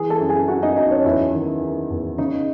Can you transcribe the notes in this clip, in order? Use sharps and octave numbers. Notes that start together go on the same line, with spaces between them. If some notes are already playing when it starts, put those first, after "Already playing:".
Already playing: E3 G#4 G#5
A4 A5
F#2
G#4 G#5
F#2 F#4 F#5
D#4 D#5
F#2 D#4 D#5
C#4 C#5
E2 E4 E5
D#3
D#3
E2
C#3 D#4 D#5